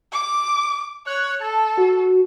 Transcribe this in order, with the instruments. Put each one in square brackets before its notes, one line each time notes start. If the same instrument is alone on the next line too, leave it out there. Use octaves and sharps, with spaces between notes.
[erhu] D6
[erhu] C#5 [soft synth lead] F#6
[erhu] A4 [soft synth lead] A5
[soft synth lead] F#4